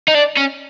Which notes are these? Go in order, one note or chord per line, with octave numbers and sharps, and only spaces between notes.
D#4
D4
C#4